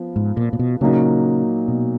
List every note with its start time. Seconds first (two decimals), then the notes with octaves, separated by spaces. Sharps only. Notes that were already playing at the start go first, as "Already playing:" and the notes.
Already playing: F3 B3
0.16 G#2
0.37 A#2
0.53 A#2
0.59 B2
0.81 A#2 C#3 F#3 A#3 D#4
1.68 B2